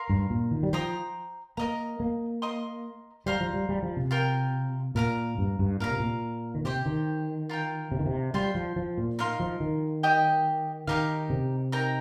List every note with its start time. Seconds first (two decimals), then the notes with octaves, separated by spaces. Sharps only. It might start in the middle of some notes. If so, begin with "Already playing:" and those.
Already playing: A#4 F5 C6
0.10 G2
0.30 A#2
0.51 D#3
0.63 G3
0.73 F3 C5 G5 A#5 D#6
1.57 A#3 A#4 D#5 A#5
2.00 A#3
2.42 A#4 D#5 C6 D#6
3.26 G3 C5 F5 A#5
3.41 F3
3.54 G3
3.69 G3
3.83 F3
3.97 C3
4.11 F4 A#4 G5
4.95 A#2 A#4 F5 A#5
5.38 G2
5.59 G2
5.80 A#2 A#4 F5 A#5
5.90 C3
6.00 A#2
6.55 D#3
6.65 C3 G4 C5 G5
6.86 D#3
7.49 F4 A#4 G5
7.92 C3
7.99 D#3
8.06 C3
8.34 G3 F4 C5 G5 C6
8.55 F3
8.76 F3
8.98 A#2
9.19 D#4 A#4 F5 C6
9.40 F3
9.60 D#3
10.03 G4 D#5 G5 D#6
10.87 D#3 D#4 G4 A#4 F5
11.30 C3
11.72 D#4 A#4 G5 A#5